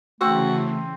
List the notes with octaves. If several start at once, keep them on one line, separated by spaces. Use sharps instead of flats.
C#3 E3 A3 C4 F#4